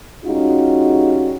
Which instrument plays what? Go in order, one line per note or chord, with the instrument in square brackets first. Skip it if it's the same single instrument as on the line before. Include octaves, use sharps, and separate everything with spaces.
[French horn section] G3 C#4 D#4 F4 F#4 G#4